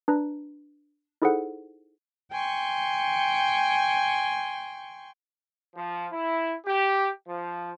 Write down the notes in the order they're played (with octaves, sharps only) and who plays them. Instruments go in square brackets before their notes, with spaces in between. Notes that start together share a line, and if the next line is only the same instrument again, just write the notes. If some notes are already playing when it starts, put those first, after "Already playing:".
[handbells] D4 B4 A#5
D#4 E4 G#4 A4 C5 F#5
[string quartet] G5 G#5 C6 C#6
[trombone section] F3
E4
G4
F3